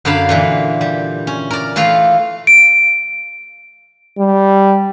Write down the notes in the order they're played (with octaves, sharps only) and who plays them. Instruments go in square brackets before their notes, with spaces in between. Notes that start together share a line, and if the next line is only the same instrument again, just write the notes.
[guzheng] F#2 D3 D5 F5 A5 B5
A#2 D3 E3
G3
C#4
A#4 D5
E3 A3 F4 F5
[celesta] D7
[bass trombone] G3